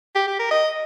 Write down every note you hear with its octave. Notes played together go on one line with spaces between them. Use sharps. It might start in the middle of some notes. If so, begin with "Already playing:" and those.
G4
G4
A#4
D#5